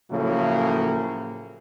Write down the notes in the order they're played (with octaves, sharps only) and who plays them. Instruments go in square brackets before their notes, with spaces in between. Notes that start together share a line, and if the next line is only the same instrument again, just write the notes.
[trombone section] A2 C#3 F3 F#3 A3 A#3